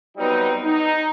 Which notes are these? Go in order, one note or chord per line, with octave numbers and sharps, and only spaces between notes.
F#3 G3 B3 C4 D#4
D#4